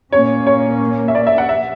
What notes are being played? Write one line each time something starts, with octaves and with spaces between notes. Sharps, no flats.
A#2 A#3 C#4 C#5
C#5
E5
D5
E5
F#5
E5